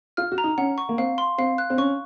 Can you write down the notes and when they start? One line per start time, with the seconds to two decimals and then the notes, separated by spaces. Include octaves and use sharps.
0.17 F4 F6
0.32 F#4
0.38 A#5
0.44 D#4
0.58 C#4 F#5
0.78 C#6
0.89 A#3
0.98 C4 F5
1.18 C6
1.38 C4 F5
1.58 F#6
1.70 C4
1.78 C#4 C#6